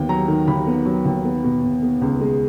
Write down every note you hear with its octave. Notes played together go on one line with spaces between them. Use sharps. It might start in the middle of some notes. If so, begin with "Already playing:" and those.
Already playing: D#2 B3 G5
F#3 A#5
D#3
D#2 B5
B3
F#3
D#2
B3
B2
B2
B3
C#2
G#3